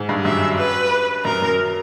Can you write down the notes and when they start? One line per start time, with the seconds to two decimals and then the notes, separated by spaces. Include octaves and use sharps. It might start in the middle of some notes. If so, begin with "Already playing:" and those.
Already playing: G#2
0.09 G2
0.25 F#2 E5
0.58 B4
1.25 F#2 A#4
1.42 F#2